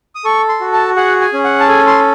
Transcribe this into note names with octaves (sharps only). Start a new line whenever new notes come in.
D#6
A4 C#6
C6
F#4
A5
G#4 F#5
G#5
C#4
F#5
A5
A4 G#5
C6